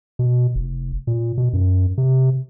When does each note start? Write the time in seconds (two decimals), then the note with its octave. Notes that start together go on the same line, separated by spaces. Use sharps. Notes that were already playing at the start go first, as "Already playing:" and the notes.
0.19 B2
0.55 F1
1.07 A#2
1.38 B2
1.53 F#2
1.98 C3